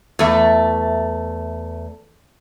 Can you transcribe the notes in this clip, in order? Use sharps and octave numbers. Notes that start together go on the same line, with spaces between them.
E2 A3